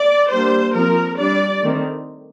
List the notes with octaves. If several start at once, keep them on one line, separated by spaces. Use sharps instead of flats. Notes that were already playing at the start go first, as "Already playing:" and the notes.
Already playing: D5
G3 A#3 D4 C5
F3 C4 A#4
G3 D4 D5
D#3 A3 C4